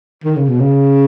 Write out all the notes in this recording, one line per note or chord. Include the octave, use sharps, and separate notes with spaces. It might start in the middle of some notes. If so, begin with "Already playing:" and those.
D#3
C#3
B2
C#3